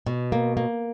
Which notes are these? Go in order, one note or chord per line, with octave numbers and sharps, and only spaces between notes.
B2
A#3
A#3